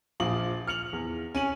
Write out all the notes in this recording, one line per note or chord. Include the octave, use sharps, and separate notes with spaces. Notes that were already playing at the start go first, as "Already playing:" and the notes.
A#1 F3 F5 D6 D#6 F#7
F6 C#7 F7 F#7
E2
C#4 D#7 F#7